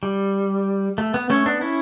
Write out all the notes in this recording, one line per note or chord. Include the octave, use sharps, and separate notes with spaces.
G3
A3
B3
A3 C#4
B3 D4
C#4 E4